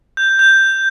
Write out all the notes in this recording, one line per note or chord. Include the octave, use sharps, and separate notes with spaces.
G6
G6